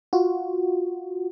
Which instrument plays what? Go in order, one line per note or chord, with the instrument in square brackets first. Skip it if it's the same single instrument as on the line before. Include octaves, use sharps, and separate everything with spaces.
[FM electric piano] F4 F#4